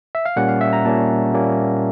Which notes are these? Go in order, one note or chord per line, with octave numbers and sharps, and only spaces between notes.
E5
F5
A#2 G3 A#3 C#4 F#5
F5
E5
A#5
A#2 G3 A#3 C#4 A5
A#2 G3 A#3 C#4